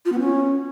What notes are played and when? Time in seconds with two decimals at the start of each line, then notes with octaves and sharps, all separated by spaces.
0.05 F4
0.12 B3
0.19 C#4